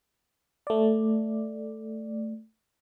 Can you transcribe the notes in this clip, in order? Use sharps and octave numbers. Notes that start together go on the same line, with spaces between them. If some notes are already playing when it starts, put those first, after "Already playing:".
A3 D5